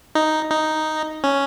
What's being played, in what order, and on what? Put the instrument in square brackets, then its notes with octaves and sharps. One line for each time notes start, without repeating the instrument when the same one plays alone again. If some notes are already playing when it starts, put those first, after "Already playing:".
[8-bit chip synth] D#4
D#4
C#4